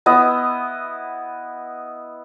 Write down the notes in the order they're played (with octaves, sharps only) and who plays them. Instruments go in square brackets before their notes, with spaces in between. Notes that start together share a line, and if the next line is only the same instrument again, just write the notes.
[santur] B3 E4 D#5